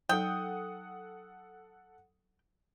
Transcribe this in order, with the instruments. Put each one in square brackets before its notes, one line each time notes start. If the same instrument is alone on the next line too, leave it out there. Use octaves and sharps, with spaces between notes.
[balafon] F#3 D#4 [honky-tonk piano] A4 F#5 D#6 [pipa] G5